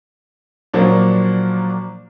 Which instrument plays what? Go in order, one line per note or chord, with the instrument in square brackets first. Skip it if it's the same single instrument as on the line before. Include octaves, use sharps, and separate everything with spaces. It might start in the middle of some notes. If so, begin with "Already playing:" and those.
[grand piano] A#2 F3 F#3 A#3 D4